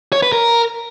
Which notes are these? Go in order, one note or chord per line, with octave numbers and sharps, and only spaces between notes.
C#5
B4
A#4